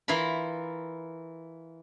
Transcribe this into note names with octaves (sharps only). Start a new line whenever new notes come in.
E3 E4 F4 A#4 B5